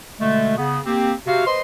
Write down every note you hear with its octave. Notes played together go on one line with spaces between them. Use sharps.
B2 D3 G#3 A3
C#3 B3
A#3 C4 G4
C3 F#4 F5
B4 C5 D#5 C6